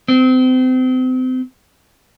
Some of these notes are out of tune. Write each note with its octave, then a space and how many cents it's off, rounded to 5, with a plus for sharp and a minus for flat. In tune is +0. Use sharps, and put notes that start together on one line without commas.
C4 -35